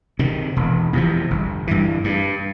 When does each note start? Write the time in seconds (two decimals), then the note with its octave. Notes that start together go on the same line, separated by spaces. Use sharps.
0.19 C3 D#3
0.56 E1
0.93 E2 C3 F3
1.31 G1
1.67 G2 E3
2.04 G2